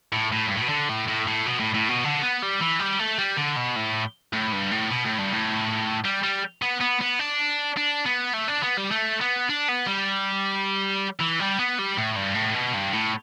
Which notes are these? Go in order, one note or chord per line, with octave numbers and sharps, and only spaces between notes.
A2
A2
G2
A2
B2
D3
A2
A2
A2
B2
A2
A2
B2
D3
B3
G3
E3
G3
A3
G3
D3
B2
A2
A2
G2
A2
B2
A2
G2
A2
G3
G3
B3
B3
B3
D4
D4
B3
A3
D4
B3
G3
A3
B3
D4
B3
G3
E3
G3
B3
G3
A2
G2
A2
B2
G2
A2